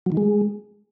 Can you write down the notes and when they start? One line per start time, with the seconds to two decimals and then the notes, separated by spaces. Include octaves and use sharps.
0.06 F#3
0.12 D#3
0.17 G#3